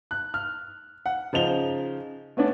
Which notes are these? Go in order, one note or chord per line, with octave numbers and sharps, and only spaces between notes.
F#6
F6
F#5
C#3 F3 D#4 F7 G7
A3 B3 C#4 D4